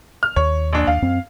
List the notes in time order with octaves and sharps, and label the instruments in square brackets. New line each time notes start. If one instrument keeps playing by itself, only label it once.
[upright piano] F6
[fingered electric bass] D#2 [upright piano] C#5
[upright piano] A#1 D4
[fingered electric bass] D#2 [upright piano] F5
[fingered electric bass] F#2 C4